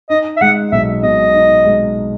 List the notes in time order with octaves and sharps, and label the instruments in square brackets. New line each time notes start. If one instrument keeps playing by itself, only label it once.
[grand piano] D#4 [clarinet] D#5
[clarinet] E5
[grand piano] G#3 [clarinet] F#5
[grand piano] B1 [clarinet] E5
[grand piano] B2 [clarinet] D#5
[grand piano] D#4
G#3